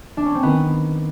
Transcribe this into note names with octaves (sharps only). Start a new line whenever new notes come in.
D4
C#4
C4
D#3 B3